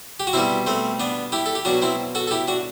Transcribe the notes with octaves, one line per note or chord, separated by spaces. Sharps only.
G4
F#4
B2 G3 C4 E4
A3 C4
B3 D4
E4 G4
A4
G4
B2 F#3 D4 F#4
C4 E4
F#4 A4
A4
E4 G4
D4 F#4